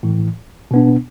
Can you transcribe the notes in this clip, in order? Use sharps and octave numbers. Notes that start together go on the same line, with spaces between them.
A1 A2 E3
B2 B3 D4